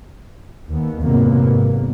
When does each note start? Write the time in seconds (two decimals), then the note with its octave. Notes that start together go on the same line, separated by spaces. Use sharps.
0.70 D#2 B3
1.03 F2 G#2 C3 F#3 A#3 B3
1.46 G#1